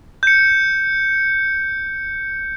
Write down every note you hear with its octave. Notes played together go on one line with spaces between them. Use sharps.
G6 C#7